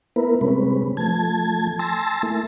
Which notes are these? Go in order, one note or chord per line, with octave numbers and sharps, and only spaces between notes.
A#3 B3 E4 A#4 B4
C3 G3 G#3 C4 C#4 B4
F3 A3 A5 G#6
G#5 A5 C6 E6 A6 A#6
A3 A#3 E4